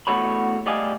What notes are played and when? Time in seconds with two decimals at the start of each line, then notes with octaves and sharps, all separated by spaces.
0.07 E2 G#2 A3 F#4 C#5 B5
0.66 G3 A3 D5 D#5 F5 G#5